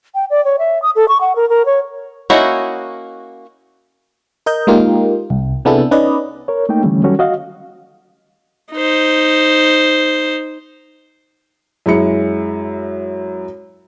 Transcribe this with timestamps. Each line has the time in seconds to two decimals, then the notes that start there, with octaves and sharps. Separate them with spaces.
0.15 G5
0.30 D5
0.45 C#5
0.59 E5
0.82 D#6
0.96 A4
1.08 C#6
1.21 F#5
1.36 A#4
1.49 A#4
1.66 C#5
2.30 A#3 C#4 D#4 E4 F#4
4.46 A#4 D#5 G6
4.67 G#3 A#3 D#4 F4 G4 A#4
5.30 C2
5.65 C3 B3 D4 E4 G#4 A4
5.91 C#4 D#4 B4 D5 D#5
6.48 A#4 C#5
6.69 A3 A#3 D#4 G5
6.83 D3 E3 G3 A3 C#4
7.03 D#3 F#3 G3 C#4 F#4 A4
7.19 F#4 D#5 F5
8.73 D#4 C5
11.86 F#2 G#3 E4 C#7